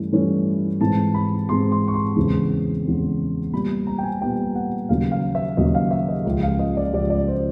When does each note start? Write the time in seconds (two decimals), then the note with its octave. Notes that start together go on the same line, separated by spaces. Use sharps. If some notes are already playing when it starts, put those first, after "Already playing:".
Already playing: G2 E3 A3 C#4 E4
0.12 G2 E3 A3 C#4 E4
0.81 G#2 E3 G#3 C4 A5
1.14 B5
1.49 G#2 E3 G#3 C4 C6
1.72 C6
1.88 C#6
1.94 C6
2.16 E2 C#3 E3 G#3 C4
2.85 E2 C#3 E3 G#3 C4
3.52 A#2 G3 B3 B5
3.87 A#5
3.98 G5
4.03 G#5
4.21 A#2 G3 B3 G5
4.55 F#5
4.89 D#2 C#3 F#3 F5
5.12 F5
5.35 E5
5.57 D#2 C#3 F#3 D#5
5.75 F5
5.91 E5
6.08 D#5
6.26 C#2 C#3 F3
6.43 F5
6.59 D#5
6.77 D5
6.93 C#2 C#3 F3 D5
7.10 D5
7.28 C5